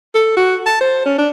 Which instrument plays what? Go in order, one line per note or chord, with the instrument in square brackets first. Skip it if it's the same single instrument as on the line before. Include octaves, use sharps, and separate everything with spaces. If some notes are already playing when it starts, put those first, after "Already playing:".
[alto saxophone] A4
F#4
A5
C5
C#4
D4